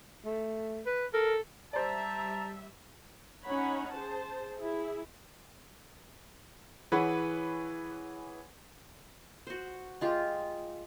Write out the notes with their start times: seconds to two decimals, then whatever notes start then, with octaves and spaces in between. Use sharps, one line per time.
0.25 A3
0.86 B4
1.13 A4 A#4
1.73 G3 C5 D5 E5 A5 A#5
3.45 C#4 D#4 C#5 F#5 B5
3.93 G#4 C5 A5
4.57 E4 G#4
6.92 E3 G#4 B4 C#5 F#5 B5
9.47 F#4 C5
10.01 G#3 F4 G4